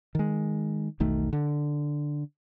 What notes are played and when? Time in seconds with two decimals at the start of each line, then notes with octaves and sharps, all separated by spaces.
0.15 D#3 G#3
1.00 E1 B1 D#3 A3
1.33 D3